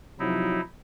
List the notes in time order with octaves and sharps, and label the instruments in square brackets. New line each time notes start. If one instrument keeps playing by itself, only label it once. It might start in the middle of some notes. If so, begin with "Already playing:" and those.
[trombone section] C3 F3 F#3 [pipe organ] D#4 E4